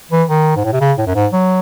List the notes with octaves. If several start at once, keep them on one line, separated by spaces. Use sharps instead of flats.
E3
D#3
G#2
A2
C3
C#3
A2
F#2
G#2
F#3